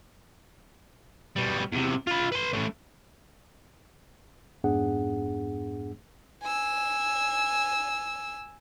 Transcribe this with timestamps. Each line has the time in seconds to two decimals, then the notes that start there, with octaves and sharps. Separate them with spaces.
1.36 B2 G3
1.72 E2 C3
2.07 F4 B5
2.32 B4 C6
2.53 A3 C#4
4.64 F2 G#2 B3 D4 G#4 F#5
6.43 G#5 E6